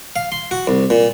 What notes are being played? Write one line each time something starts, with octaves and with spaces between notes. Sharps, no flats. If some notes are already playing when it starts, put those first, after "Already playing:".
F5
C6
F#4
C2
A#2